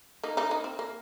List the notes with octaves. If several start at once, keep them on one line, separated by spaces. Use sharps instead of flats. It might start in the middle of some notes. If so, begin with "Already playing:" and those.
A#3 D#4
A#3 D#4
A#3 D#4
C4
A#3